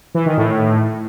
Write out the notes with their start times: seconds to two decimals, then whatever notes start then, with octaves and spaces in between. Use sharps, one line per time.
0.15 E3
0.26 D#3
0.37 A2